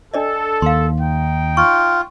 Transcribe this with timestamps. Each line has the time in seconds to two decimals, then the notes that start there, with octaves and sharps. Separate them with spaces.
0.14 D4 A4 D5 D#5
0.62 D#2 F5 C6
0.98 D#4 G5
1.57 F4 C#6